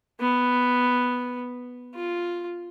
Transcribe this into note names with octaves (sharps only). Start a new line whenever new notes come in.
B3
F4